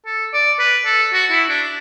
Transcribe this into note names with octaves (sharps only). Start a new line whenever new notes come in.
A4
D5
B4
A4
F#4
E4
D4